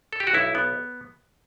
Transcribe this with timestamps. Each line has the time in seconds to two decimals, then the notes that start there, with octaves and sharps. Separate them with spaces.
0.13 A4
0.20 G4
0.27 F#4
0.34 B1 E4
0.55 B3